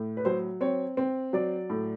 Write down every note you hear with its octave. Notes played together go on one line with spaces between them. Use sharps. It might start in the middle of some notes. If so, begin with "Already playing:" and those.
Already playing: A2
B4
F#3 C5
C4 C#5
C4
F#3 D5
A2